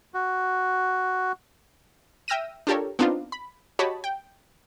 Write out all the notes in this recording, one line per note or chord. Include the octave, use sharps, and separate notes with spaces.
F#4
E5 G5 E6 F6 A#6 D#7
D4 F4 G4 A4 A#4 C#5
B3 C4 D4 D#4 F4
B5
F#4 G4 C#5 D#5 A5 B5
G5